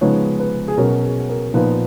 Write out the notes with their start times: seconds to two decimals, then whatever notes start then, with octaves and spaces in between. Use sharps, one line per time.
0.01 C#3 F3 G#3 B3 D#4 C#5
0.40 B4
0.68 G#4
0.77 B2 F#3 C#4 A#4
1.03 G#4
1.29 A#4
1.53 A#2 F3 B3 D#4 B4